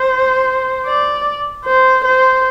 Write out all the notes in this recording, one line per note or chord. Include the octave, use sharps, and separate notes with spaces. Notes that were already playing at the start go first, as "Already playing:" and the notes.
Already playing: C5
D5
C5
C5